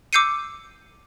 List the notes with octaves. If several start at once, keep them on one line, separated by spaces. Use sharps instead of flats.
D6 E6 G6 C7 C#7 D#7